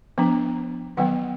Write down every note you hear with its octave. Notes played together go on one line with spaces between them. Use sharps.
F3 B3 D4
D#3 F#3 B3 F#5